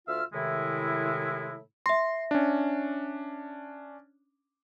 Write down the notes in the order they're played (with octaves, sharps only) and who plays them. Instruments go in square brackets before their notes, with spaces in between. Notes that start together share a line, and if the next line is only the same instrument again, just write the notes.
[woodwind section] D2 F4 E5 F5 E6 F6
A2 C3 D#3 G#3 E4
[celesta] E5 A#6 [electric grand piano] C6
[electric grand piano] C#4 D4